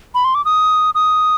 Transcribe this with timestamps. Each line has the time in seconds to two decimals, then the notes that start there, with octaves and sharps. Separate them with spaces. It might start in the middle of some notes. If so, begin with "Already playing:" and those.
0.15 B5
0.24 C6
0.35 D6
0.45 D#6
0.95 D#6